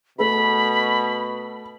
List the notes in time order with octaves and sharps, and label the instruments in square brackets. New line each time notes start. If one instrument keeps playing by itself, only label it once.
[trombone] B2 [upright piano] A3 A4 B4 [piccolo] B5